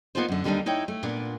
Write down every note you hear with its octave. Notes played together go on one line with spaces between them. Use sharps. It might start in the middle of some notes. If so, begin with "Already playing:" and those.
A#3 B3 C#4 D#4 F4 C5
F#2 D3
D#2 D3 G3 C4 D4 D#4
D#4 E4 C#5 G5
A3
A#2 B3 D4